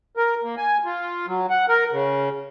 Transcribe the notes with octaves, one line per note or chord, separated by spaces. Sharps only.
A#4
A#3
G#5
F4
F#3
F#5
A#4
C#3